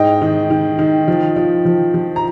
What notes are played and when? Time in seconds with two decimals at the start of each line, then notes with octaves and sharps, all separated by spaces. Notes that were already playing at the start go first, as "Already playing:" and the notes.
Already playing: G#2 D#5 G5
0.22 D#3
0.50 D#3
0.79 D#3
1.08 F3
1.36 F3
1.65 F3
1.94 F3
2.16 A#5